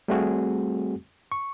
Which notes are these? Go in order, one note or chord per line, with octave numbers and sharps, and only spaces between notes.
G3 A3 C4 F#4 G#4
C#6